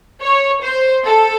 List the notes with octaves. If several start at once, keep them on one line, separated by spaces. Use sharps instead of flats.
C#5
C5
A4